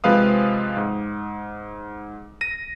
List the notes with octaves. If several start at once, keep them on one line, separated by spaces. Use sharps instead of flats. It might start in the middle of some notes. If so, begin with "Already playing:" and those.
C3 F3 G#3 B4 F5 D#6
G#2
A#6 D#7